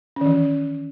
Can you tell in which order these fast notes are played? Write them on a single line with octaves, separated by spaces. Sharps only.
C#4 D#3 E3